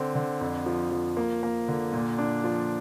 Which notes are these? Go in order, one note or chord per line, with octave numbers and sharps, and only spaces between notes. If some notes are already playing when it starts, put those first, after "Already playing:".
Already playing: D3 C4
D3
F2
F3
F3
A#3
A#3
D3
A#2
D4
F3